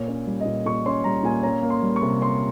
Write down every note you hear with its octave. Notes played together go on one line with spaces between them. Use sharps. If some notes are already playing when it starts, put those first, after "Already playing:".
Already playing: A#2 C#5
C#4
G3
D#5
A#2
A#2 C#6
C#4 C6
G3 A#5
A#2 G#5
C#4 A#5
A#3
C6
G3
C#6
C3
C#4 C6